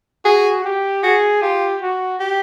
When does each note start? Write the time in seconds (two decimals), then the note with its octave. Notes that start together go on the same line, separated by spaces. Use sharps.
0.25 F#4 G#4
0.65 G4
1.03 F#4 G#4
1.42 F4 G4
1.82 F#4
2.20 G4